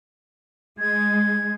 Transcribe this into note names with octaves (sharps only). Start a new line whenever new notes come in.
G#3 G#6